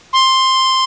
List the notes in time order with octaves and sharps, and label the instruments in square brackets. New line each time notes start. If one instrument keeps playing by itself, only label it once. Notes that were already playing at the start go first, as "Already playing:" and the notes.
[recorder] C6